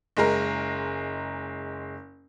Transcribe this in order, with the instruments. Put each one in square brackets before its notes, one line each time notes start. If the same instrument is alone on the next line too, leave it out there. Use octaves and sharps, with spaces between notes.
[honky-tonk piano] F#1 G#3 A#4